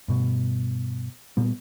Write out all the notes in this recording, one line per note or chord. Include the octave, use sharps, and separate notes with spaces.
G2 B2
A#2 G3 B3